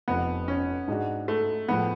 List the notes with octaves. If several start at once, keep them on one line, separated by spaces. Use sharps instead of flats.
F1 F2 F3 B3
C#4
G#2 G#3 D4 F#4
A3
A2 F3 G#3 B3